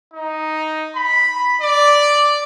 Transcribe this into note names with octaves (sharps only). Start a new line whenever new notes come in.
D#4
B5
D5